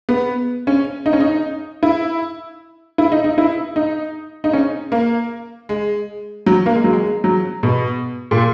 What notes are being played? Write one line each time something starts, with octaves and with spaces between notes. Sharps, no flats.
B3
C#4
D#4
C#4
D#4
E4
E4
D#4
D#4
E4
D#4
D#4
C#4
A#3
G#3
F#3
A#3
G#3
F#3
G#3
F#3
B2
A#2